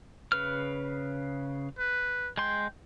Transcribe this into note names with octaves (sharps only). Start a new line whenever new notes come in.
C#3 B4 F6
B4
G#3 G5 C6